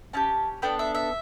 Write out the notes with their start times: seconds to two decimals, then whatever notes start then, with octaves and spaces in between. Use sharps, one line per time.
0.13 C#4 E4 G4 A5
0.62 B3 D4 A4 G5
0.79 E5
0.95 E5